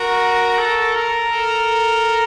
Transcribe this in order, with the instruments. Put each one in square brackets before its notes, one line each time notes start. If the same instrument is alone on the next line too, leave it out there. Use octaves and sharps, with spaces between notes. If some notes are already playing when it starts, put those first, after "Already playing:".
Already playing: [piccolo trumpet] F#4 [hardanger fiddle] A#4
[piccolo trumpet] A4
A#4
[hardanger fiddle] A4